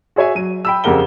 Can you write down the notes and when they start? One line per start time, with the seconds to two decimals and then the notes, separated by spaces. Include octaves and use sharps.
0.16 F#4 G#4 C#5 E5 G#5
0.35 F#3 D#7
0.65 G5 B5 E6
0.84 F2 C#3 G4 A#4 F#5 G7